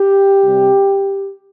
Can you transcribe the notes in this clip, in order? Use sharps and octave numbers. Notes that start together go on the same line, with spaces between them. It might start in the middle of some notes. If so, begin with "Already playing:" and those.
Already playing: G4
C3 G3